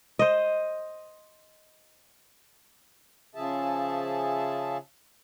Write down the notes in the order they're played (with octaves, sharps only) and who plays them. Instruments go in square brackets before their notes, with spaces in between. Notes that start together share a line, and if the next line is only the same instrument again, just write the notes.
[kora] C5 D#5
[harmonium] C#3 F3 G#4 E5 A5